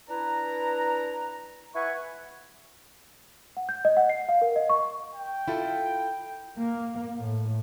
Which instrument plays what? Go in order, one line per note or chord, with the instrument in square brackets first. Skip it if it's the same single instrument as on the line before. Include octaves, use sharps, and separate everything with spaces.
[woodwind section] D4 E4 B4 A#5
E4 B4 E5 F#5 G#5 C#6
[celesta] F#5
G6
D#5
F#5
C7
F5
A#4
D#5
C#6
[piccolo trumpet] G5
[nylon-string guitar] E4 F4 A4
[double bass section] A#3
A2